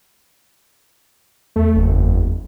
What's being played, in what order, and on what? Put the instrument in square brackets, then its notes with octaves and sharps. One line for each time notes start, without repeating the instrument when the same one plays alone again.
[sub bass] E2 [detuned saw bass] A3
[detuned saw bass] F#1